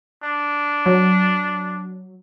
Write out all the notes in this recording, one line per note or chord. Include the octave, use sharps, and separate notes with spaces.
D4
F#3